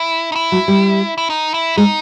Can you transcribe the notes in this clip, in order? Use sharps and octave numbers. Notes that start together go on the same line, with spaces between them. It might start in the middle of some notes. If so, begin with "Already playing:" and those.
Already playing: E4
D#4
E4
F#3
G3
E4
D#4
E4
G#3 D#4